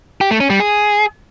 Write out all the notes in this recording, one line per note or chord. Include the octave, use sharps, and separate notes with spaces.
G4
A3
C#4
G3
G#4